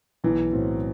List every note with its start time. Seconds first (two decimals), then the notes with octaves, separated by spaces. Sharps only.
0.24 B1 E3
0.53 A2 F#3 C4